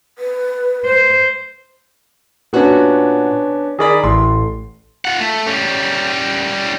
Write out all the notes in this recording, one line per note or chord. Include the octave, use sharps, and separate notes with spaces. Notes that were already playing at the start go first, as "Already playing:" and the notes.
B4
C5
A#2 B3 C#4 D4 F#4
D#3 G#4 A#4 D5 B5
A1 A2 C6
F4 F#5
A3
G3 C#4